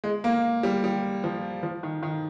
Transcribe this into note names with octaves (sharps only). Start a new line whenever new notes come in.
G#3
A#3
G3
G3
F3
F3
D#3
D#3